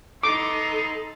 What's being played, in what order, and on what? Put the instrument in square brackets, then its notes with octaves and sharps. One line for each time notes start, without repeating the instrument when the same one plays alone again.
[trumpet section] B3 E4 C6 [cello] D#4 [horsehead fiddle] A4 [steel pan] D6